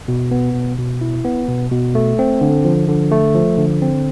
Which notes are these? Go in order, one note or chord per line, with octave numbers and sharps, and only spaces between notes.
B2
B3
B2
B2
E4
B3
B2
B2
A3
C4
D3
F3
D3
A3
F3
D3
C4